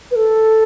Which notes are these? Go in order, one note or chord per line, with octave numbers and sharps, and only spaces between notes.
B4
A4